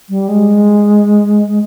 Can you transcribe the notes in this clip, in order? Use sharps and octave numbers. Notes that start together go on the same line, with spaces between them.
G3
G#3